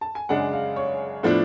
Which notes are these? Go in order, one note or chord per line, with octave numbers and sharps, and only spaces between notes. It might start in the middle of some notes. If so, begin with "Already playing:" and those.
A5
G#5
F#2 C#3 G#3 D4 F#5
F5
C#5
A2 F3 B3 D4